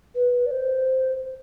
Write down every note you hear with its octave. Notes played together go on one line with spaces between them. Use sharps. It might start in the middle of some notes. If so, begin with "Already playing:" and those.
B4
D5
C5